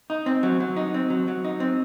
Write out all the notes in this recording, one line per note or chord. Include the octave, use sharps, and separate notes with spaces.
D#4
C4
F#3
F#3
D#4
C4
F#3
F#3
D#4
C4